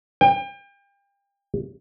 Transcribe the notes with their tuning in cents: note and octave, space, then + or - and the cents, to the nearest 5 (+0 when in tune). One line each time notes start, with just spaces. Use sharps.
G5 +35